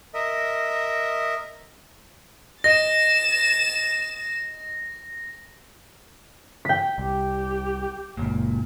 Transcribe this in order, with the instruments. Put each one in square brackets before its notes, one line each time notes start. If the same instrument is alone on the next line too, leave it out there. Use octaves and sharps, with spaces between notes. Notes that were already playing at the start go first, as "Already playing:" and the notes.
[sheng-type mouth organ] A#4 D#5 E5
[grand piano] D#5 [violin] A6 E7 [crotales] A#6
[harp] G5 B6
[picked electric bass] C2 [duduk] G4
[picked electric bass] F#1 C#2 [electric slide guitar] A#2